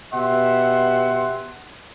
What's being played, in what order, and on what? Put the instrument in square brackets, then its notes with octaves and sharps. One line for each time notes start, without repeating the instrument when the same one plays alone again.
[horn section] B2 G4 E5 F#5 C6